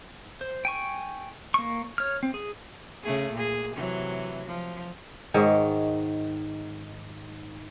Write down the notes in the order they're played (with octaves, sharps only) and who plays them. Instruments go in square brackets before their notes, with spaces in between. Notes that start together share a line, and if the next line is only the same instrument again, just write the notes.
[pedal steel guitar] C5
G5 G#5 C#6
A#3 C#6
C#5 F6
C4
G#4
[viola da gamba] C#3 A3 G#4
A#2 G#4
C3 E3 F#3
F3
[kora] G#2 D#3 C#5